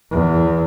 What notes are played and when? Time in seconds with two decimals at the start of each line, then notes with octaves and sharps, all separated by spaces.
0.11 E2